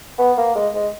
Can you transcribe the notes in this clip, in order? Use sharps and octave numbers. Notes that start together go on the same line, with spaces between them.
B3
A#3
G#3
G#3